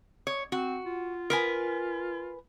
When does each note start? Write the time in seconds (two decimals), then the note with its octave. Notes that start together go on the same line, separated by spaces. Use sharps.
0.27 C#5
0.52 C4 F#4
0.85 F4
1.30 A#4 B4 G#5